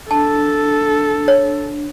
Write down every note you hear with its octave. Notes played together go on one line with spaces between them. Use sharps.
D4 A4 A5
C#5